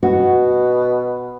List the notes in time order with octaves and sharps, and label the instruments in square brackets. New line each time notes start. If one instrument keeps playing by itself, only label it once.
[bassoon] B2 [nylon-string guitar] F#4